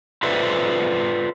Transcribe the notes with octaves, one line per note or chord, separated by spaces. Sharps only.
F4 A4 B4 C5 D5 E5